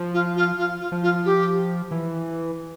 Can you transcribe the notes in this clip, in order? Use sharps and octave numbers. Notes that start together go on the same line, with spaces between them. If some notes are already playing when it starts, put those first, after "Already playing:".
Already playing: F3
F4
F4
F4
F4
F3
F4
G4
E3